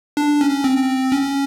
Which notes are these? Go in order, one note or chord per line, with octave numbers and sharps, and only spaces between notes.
D4
C#4
C4
C#4